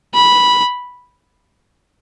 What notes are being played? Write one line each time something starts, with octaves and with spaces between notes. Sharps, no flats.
B5